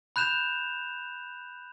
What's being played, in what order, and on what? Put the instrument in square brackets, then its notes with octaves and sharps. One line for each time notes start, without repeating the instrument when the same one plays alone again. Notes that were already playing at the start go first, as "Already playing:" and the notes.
[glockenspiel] B5 F#6 G6 E7 F7